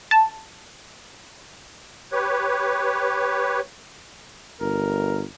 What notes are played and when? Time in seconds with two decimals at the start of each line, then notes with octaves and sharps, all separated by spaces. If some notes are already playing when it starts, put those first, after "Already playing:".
0.11 A5
2.12 G4 B4 C#5
4.60 G1 A#4